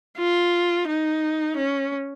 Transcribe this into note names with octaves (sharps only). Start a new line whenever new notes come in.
F4
D#4
C#4